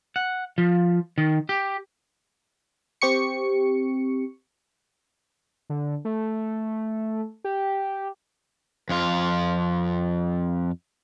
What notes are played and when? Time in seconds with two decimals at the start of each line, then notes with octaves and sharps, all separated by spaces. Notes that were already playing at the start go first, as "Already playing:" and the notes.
0.16 F#5
0.58 F3
1.18 D#3
1.49 G4
3.01 C4 G4 C#6 C#7
5.70 D3
6.05 A3
7.44 G4
8.89 F2 F4